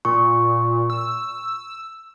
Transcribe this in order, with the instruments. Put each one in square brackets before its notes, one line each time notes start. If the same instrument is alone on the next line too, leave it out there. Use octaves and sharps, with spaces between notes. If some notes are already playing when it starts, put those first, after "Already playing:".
[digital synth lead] A#2 [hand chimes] C#6
[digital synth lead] E6